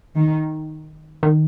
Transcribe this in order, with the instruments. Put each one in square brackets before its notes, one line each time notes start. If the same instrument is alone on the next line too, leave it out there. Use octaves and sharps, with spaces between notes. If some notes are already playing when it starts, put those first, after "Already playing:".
[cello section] D#3
[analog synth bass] D#3